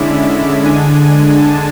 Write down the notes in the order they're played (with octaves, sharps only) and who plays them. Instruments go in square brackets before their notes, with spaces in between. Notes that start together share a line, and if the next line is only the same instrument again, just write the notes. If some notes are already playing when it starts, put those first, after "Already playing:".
Already playing: [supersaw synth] D3 G#3 C#4 E4 D5 E5
D3 G#3 D4 G#5
G#5
A5